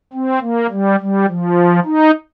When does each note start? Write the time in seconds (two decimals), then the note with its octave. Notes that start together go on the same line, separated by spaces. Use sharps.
0.13 C4
0.41 A#3
0.70 G3
1.00 G3
1.28 F3
1.85 D#4